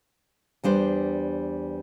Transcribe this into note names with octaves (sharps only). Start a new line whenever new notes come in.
E2 G3 D4 C5